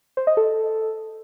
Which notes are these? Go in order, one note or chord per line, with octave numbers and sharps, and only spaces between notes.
C5
D#5
A4